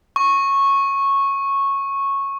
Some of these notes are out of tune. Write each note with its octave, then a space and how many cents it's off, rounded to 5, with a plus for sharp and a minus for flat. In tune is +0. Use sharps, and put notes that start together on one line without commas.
C#6 -10